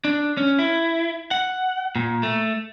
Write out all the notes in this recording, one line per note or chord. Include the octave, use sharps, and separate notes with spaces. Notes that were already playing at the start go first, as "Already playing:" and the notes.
D4
C#4
E4
F#5
A#2
A3